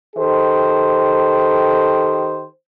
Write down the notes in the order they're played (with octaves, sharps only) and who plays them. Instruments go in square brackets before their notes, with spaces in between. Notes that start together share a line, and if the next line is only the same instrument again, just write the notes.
[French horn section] D#3 G4 A4 C5